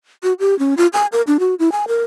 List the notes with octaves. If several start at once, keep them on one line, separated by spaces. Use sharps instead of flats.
F#4
G4
C#4
F4
G#5
A#4
D4
F#4
E4
G#5
A#4